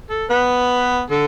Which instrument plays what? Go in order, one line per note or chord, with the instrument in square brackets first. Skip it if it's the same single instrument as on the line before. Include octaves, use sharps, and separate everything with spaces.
[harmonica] A4
[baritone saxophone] B3 [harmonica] B4
[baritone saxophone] D3 [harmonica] A4